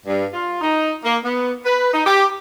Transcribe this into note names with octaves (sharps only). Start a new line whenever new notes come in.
G2
F4
D#4
A#3
B3
B4
D#4
G4